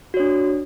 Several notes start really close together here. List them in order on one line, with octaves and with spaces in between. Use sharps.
F#4 C#5 D4